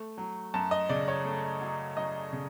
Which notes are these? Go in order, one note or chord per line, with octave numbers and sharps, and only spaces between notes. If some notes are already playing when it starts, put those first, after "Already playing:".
Already playing: A3
F#3
F#2 A5
D#5
C#3 D5
C#5
A3
F#3
F#2 D#5
C#3